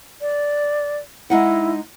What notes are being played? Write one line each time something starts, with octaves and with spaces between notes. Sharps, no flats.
D5
G#3 D#4 E4 F#5